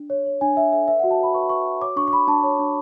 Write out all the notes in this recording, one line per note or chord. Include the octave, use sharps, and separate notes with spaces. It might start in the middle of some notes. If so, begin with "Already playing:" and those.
Already playing: D4
C#5
C#5
D4 G#5
C#5 E5
A4 E5
B4 E5
F#5
F#4
A5
B4 B5
B4 C#6
B5
B4 C#6
F#4
C#5 D6
D4 C#6
C#6
D4 B5
D4 A5
C#5
D4